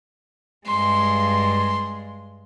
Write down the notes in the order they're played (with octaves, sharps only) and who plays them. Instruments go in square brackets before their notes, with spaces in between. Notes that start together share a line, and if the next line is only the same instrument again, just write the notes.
[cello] G2 G#3 [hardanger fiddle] C6